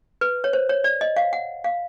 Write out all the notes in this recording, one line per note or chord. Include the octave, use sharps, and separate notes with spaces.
B4
C#5
C5
C#5
D5
D#5
F5
F#5
F5